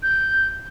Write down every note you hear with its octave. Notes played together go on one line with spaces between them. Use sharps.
G6